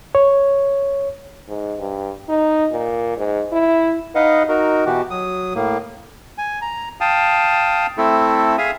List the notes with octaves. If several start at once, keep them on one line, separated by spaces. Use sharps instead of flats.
C#5
G#2
G2
D#4
A#2
G#2
E4
D#4 B4 D#5 F5 F#5
D#4 F#4 A#4
B2 E3 F#4 G4
F#3 D#6
A2 A#3
G#5
A#5
F5 G5 A5 D#6
A3 C4 E4 A4
G#4 E5 F5 D#6